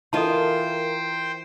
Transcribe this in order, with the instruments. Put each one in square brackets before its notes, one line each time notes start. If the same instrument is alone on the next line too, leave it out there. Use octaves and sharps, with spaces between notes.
[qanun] E3 F4 [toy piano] A4 D#5 A5 [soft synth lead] A#4 [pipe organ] C5 G5